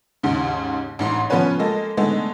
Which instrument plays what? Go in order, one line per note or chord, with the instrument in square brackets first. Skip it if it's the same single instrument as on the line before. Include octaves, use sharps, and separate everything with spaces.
[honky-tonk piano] D#2 G#2 C#3
A1 G#2 C6
F3 B3 C#4 F4 B4 C#5
G#3 A#3 A4 D#5
D3 G#3 A3 B3 D#4